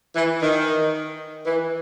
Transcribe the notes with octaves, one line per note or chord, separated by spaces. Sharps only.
E3
D#3
E3